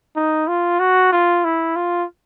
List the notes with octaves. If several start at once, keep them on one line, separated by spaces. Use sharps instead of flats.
D#4
F4
F#4
F4
E4
F4